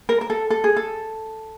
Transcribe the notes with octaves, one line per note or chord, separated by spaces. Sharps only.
A#4
A#4
A4
A4
G#4
A4